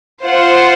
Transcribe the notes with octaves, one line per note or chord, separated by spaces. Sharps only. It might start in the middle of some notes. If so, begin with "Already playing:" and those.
F4 C5 F#5